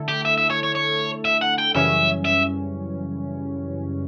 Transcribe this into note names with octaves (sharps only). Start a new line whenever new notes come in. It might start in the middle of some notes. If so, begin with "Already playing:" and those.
Already playing: D3 A3 E4 A4
G4
E5
E5
C#5
C#5
C#5
E5
F#5
G5
F#2 C#3 E3 G3 C#4 E5
E5